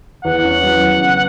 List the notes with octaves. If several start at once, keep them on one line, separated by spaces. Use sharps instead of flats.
E2 F#5
C#4
F#3
E2
C#3